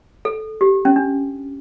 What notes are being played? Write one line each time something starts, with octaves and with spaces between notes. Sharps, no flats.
A4
G4
C#4
D4